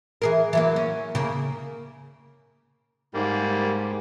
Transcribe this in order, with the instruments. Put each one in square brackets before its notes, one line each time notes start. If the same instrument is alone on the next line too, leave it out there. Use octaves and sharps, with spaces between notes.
[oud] E3 G#4 A#4
E3 F#3 A#3
C#4
C#3 A#3
[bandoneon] G#2 [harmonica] G3 A#3